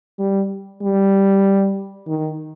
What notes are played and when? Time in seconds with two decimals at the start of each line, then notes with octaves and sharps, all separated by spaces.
0.19 G3
0.82 G3
2.07 D#3